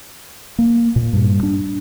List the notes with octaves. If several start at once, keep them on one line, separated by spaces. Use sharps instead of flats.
A#3
A#2
G2
D4